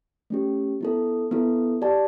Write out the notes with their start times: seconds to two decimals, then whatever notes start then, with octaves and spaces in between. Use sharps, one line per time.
0.30 A3 C#4 G4
0.81 B3 E4 A4
1.31 B3 E4 A4
1.82 G4 D5 A5